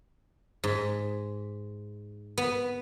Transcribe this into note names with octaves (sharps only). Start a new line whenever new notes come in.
G#2
B3